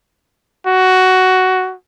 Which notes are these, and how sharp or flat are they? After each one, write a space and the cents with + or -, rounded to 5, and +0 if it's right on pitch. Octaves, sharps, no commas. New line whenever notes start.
F#4 +10